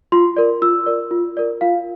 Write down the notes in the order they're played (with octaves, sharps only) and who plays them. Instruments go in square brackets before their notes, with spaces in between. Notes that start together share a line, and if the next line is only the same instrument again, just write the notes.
[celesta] F4 C6
A#4 D5
F4 E6
A#4 D5
F4
A#4 D5
F4 F5